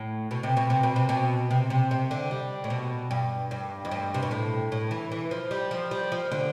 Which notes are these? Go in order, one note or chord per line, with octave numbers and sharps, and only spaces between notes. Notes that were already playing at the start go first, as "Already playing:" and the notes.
Already playing: A2
B2
C3
B2
C3
B2
C3
B2
C3
C3
C3
D3
G3
A2
B2
G2
G2
F2
G2
C3
B2
A2
A2
E3
E3
F3
G3
F3
G3
F3
D3